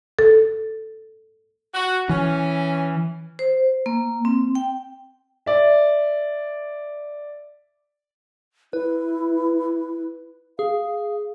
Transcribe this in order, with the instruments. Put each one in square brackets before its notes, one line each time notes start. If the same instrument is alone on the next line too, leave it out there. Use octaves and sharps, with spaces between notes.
[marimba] A4
[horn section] F#4
[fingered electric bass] E3 [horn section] C#4
[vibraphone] C5
A#3
C4
G5
[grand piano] D5 E5
[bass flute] E4 [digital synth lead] B4
[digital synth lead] G#4 [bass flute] F5